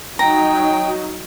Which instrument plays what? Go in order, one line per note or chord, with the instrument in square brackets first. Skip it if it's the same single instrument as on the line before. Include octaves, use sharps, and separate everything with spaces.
[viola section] F#3 D#4 [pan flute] G5 [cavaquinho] A#5